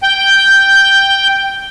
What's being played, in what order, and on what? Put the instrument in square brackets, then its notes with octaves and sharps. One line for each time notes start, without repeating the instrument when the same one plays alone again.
[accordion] G5 G6